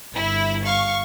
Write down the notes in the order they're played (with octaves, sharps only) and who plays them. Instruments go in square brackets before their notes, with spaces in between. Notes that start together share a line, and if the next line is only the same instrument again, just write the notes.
[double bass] G1 [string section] E4
[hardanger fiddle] F5 [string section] C#6